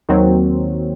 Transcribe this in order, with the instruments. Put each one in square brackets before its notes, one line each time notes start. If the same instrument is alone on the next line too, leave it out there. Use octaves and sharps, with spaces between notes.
[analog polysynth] D#2 D#3 F#3 C4